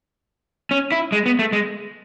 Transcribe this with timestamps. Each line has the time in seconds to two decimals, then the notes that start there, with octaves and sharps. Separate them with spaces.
0.71 C#4
0.92 E4
1.12 G#3
1.26 B3
1.39 A3
1.52 G#3